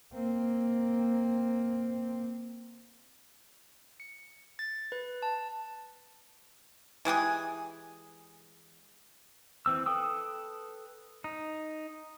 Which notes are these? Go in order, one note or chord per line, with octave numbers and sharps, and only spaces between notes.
A#3 C4
C#7
A6
B4
A5
E3 G#3 G4 G#4
E3 C4 E6
A4 B4 G5 D#6 E6
D#4